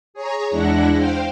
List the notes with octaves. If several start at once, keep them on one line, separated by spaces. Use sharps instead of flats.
G#4 C#5 A#5
E2 G#3 D4 E4 F#5 A#6
C5 F5 G5